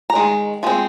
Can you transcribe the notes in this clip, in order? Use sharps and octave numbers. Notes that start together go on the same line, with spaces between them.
A#5
D#3 G#3
F3 G#3 C4